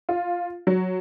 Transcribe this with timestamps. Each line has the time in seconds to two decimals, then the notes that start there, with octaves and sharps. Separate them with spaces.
0.09 F4
0.67 F#3